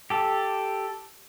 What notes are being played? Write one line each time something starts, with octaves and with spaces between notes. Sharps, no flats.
G4 A4